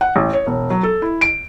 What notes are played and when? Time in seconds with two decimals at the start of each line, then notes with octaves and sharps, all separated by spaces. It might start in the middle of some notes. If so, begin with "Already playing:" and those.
0.01 F#5
0.16 A1
0.33 C#5
0.47 E1
0.70 F#3
0.83 A4
1.02 E4
1.21 D7